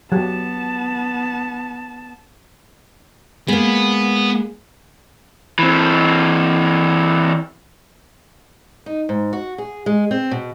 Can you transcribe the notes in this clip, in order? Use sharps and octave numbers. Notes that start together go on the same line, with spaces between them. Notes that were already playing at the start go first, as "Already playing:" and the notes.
F#3 B3 G4 A5
G#3 A#3 B3
E3 C4
D#4
G#2
F#4
G#4
G#3
C4
B2